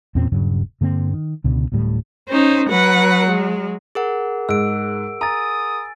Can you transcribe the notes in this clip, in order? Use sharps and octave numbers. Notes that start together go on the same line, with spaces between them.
E2 A#2 C4 C#4
D#1 G2 C#3 F#3
G2 D3 A#3 C4
D#3
C#2 B2 D3
D1 D2 A2 G3
C#4 D#4 C5
F#3 B4 F#5
G#3
G#4 A#4 F#5
G#2 E6 D7
G#5 A#5 D#6 A6